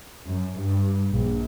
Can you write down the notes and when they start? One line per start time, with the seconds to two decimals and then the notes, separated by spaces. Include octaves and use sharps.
0.25 F#2
0.58 G2
1.11 A#1